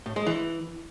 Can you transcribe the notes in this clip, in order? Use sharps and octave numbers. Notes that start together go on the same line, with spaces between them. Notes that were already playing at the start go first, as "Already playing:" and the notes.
A2
G#3
E3